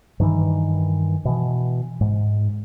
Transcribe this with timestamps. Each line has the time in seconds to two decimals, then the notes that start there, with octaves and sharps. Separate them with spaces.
0.20 G2 D#3 E3
1.25 B2 E3
2.01 G#2